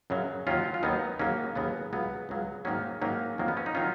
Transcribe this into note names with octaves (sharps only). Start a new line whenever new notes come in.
F#2 C#3 F#3
D#2 D#3 F#3 C#4 F4
F4
D#2 D#3 F#3 B3 D#4
D#2 C#3 F#3 A#3 C#4
D#2 C#3 F#3 B3
C#2 C#3 F#3 B3
C#2 C#3 F#3
G#2 D#3 F#3 A#3 C#4
G#2 D#3 F#3 A#3 C#4
F2 D#3 F#3 A#3
B3
C#4
D#4
D#3 F#3 C#4 F4